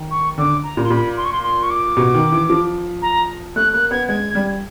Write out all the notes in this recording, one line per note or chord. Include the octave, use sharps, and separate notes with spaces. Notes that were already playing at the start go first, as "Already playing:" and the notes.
Already playing: D#3
C#6
D3 D6
A#5
A#2
C6
A#2 B5
C6
C#6
C6
C6
C#6
D6
B2
D#3
E3
F3
A#5
A3 F#6
A#3 F#6
B3 G#6
G#3 G#6
G3